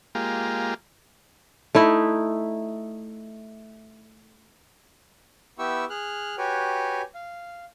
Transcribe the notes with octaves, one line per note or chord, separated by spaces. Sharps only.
G#3 A#3 F4 G4
A3 D#4 E4
B3 E4 G4 G5 C#6 E6
G#4 F6 F#6
F#4 G4 B4 C#5 G5 G#5
F5